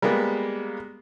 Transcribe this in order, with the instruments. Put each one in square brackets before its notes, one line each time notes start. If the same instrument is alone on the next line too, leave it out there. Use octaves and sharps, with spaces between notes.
[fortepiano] G3 G#3 A#3 B3